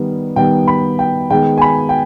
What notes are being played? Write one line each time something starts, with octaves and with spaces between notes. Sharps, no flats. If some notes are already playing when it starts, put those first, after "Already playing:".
Already playing: D#3 G3 B3
D#3 G3 B3 G5
B5
G5
D#3 G#3 B3 G5
G#5
B5
G5